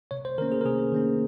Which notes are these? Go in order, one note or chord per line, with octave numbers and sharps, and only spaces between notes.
C3 C#5
C5
D#3 A#3 C#4 A#4
G#4
A#4
C3 G#4
D#3 A#3 C#4